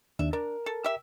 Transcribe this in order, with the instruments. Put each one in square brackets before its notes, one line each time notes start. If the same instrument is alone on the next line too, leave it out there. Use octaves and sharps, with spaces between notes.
[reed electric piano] D#2 D4 [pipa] E5
[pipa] D4 [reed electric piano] A#4
[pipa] A4
G4 E5